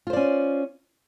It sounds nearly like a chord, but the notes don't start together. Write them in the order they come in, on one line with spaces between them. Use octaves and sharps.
F4 C5 D5 C#4